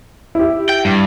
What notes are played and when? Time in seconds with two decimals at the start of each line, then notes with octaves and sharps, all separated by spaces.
0.35 E4 G4
0.69 G5
0.85 G2